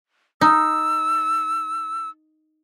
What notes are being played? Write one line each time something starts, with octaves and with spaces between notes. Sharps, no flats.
D#4 E6